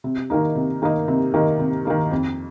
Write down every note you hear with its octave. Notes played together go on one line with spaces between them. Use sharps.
C3
D#3 A#3 D#4
C3
D#3 A#3 D#4
C3
D#3 A#3 D#4
C3
D#3 A#3 D#4
F2